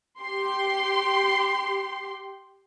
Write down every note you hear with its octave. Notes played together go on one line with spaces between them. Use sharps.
G4 C6